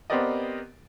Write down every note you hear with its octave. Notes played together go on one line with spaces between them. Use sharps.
B3 C4 G4 A#4 D5 D#5